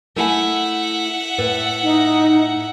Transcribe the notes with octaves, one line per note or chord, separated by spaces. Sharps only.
A3 E4 E5 F#5 G#5
A2 B4
D#4